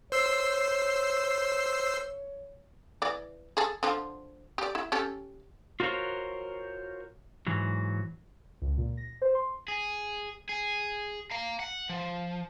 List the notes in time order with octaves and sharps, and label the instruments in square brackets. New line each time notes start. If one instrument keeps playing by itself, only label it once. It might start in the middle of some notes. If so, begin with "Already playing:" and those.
[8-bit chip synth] C5 E6 C7 [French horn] C#5
[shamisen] E3 D5
G#4 A4
D3 F3
G4 D5
E4 E5
C#4 G4 A4
[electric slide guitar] F4 F#4 A#4 C5 C#5
G#2 E3 F#3
[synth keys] C#2
A#2
A#6
C5
C6
[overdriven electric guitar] G#4
G#4
F5 A#5
F#5
F3